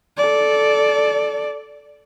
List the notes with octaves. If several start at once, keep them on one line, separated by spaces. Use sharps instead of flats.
A4 D5